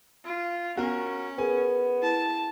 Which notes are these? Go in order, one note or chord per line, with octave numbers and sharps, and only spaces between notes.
F4
B3 C#4 F#4 A#4
B3 G#4 A#4 G#5
E4 A5